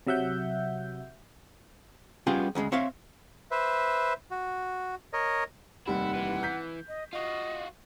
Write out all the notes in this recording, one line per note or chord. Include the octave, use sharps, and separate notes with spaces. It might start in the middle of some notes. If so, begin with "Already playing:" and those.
C3 F#3 E5 F#5 G6
G3 B3 C#4 F4 G4 G#4
D2 C#3 F#3 G#3
C4 C#5 E5 F5
B4 C5 E5
F#4
A#4 C#5 D#5
F1 D#2 G3 E4 F#5
E3
G6 B6
D#5
F4 F#4 D#5